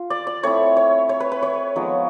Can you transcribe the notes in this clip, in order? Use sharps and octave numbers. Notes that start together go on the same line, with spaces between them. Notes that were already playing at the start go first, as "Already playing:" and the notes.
Already playing: F4
D5
D5
A3 C4 E4 C#5
C#5
C#5
B4
B4
C#5
F3 G#3 B3 D#4